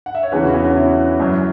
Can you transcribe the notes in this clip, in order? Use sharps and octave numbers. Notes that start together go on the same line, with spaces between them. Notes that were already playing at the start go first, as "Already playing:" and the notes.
F#5
E5
C#5
E2 C#3 E3 B4
F#4
B3
C#4
E4
F#2 F#3